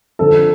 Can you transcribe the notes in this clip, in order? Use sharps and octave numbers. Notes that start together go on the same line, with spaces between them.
D3 F3 C4 A4